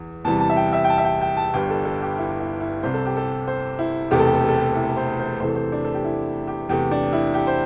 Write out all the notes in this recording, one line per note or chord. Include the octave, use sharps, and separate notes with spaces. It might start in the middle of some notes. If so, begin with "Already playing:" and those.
Already playing: E2 E3
E2 C3 E3 G3 A5
A5
E5
G5
E5
G5
A5
E5
G5
G5
A5
G1 G2 G3 G5
A4
A4
G4
E4
E4
E4
C2 C3 G3 C5
A4
G4
A4
C5
E4
E1 E2 C3 A3 G4
A4
G4
A4
G4
A4
G4
E4
C5
C5
E2 C3 E3 A3 C5
A4
C5
D4
A4
G4
E4
G4
E2 C3 A3 G4
D4
E4
G4
C5